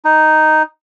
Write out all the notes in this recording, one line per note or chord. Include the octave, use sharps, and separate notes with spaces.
D#4